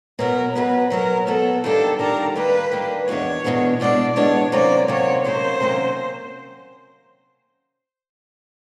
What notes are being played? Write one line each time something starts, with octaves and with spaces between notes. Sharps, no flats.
B2 F#3 B3 A#4
B2 F#3 B3 B4
B2 F#3 B3 A#4
B2 F#3 B3 A4
D#3 G3 A#3 D4 G4 A4
D#3 G3 A#3 D4 G4 A#4
D#3 G3 A#3 D4 G4 B4
D#3 G3 A#3 D4 G4
E2 B2 G#3 B3 D4 C#5
E2 B2 G#3 B3 D4
E2 B2 G#3 B3 D4 D5
E2 B2 G#3 B3 D4 C#5
C3 D#3 F#3 A#3 C#4 D5
C3 D#3 F#3 A#3 C#4 C#5
C3 D#3 F#3 A#3 C#4 C5
C3 D#3 F#3 A#3 C#4